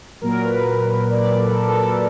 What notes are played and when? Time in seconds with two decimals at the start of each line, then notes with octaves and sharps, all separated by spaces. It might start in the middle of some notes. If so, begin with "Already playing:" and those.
0.21 A#2 F#3 A#4
0.44 B4
1.10 D5
1.39 A4
1.68 A4